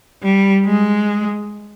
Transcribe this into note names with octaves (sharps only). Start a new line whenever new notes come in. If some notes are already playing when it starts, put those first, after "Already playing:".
G3
G#3